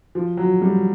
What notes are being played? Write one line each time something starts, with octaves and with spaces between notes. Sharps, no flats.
F3
F#3
G3